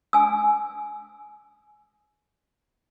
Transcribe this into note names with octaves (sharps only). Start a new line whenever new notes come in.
G#5 E6